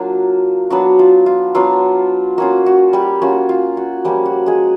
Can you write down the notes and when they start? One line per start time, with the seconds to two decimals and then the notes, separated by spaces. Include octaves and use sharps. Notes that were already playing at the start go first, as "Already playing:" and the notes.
Already playing: F#3 A#3 D4 F4
0.70 F#3 B3 D4 F#4
0.99 F4
1.26 F4
1.55 F#3 B3 D4 F4
2.38 A#3 C#4 F4 F#4
2.66 F#4
2.93 G3 G4
3.22 A#3 C#4 F4 F#4
3.49 F4
3.77 F#4
4.05 F3 G3 A#3 C#4 G4
4.25 F#4
4.46 G#3 G#4